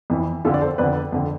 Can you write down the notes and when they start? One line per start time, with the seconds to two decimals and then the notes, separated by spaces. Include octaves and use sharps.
0.10 F2 E3
0.45 F2 D3 F4 A4
0.54 D5
0.61 A4 C5
0.78 F2 D3 B4 D5
1.12 F2 D3